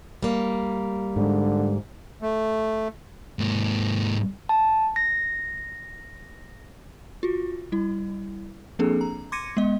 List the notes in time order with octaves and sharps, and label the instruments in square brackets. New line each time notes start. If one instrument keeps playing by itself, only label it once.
[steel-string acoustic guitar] G3 A#3
[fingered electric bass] G#2 G#3 [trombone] D3
[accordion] A3
[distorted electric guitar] G#2 A#3
[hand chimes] A5
A#6
[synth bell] F4 F#4
G3 E4
F3 A#3 C4 D4 G#4 A4
A#5
C6 D6 G#6 A#6 C#7 D#7
G#3 B3 D#5